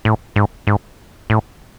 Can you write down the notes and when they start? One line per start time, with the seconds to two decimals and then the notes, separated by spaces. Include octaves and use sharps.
0.05 A2
0.36 G#2
0.67 G#2
1.30 A2